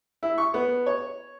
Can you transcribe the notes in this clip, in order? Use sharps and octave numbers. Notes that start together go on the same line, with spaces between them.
E4
C#6
B3
C#5